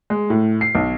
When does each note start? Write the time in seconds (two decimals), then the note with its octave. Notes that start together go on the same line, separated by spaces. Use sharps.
0.10 G#3
0.30 A2
0.61 C7
0.75 B1